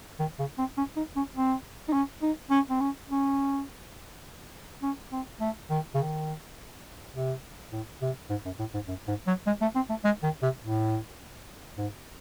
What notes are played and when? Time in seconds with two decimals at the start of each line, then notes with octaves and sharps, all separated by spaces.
0.19 D#3
0.39 C#3
0.58 C4
0.77 C#4
0.96 D#4
1.16 C#4
1.36 C4
1.88 D#4
1.93 C#4
2.22 D#4
2.50 C#4
2.70 C4
2.81 C#4
3.09 C#4
4.82 C#4
5.12 C4
5.40 A3
5.70 D#3
5.95 C#3
5.98 D#3
7.15 C3
7.72 A2
8.01 C3
8.30 G#2
8.45 F#2
8.59 A2
8.74 G#2
8.88 F#2
9.08 G#2
9.27 F#3
9.47 G#3
9.61 A3
9.75 C4
9.89 A3
10.04 G#3
10.23 D#3
10.43 C3
10.62 A2
11.78 G#2